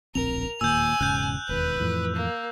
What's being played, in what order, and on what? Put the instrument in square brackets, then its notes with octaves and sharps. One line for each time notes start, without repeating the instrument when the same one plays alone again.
[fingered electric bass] D1 A#1 C4 [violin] A#4 [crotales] F7
[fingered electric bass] E1 D#2 A#2 [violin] G#5 [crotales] E6 G6
[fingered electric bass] E1 G#2 C#3 [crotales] F#6 G6
[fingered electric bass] E1 D#2 [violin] B4
[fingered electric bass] F2 A2 E3
[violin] A#3